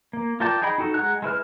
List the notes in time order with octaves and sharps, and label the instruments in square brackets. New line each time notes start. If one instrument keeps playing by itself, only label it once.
[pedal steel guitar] A#3
F4 A#4 D5 G5 A5
D#4 G#4 D#5 G5 B5
D#4 F#4 A4
G#3 C5 F#5 A#5 F#6
G#3 E4 B4 F6